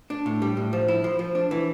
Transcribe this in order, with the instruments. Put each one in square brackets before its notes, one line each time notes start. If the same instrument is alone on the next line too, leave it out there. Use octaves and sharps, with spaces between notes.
[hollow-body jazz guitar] D4
A2
G3
A2
F3
E4
F3
F3
D4
E3